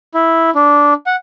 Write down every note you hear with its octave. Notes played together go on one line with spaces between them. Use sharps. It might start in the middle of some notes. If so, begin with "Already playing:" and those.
E4
D4
F#5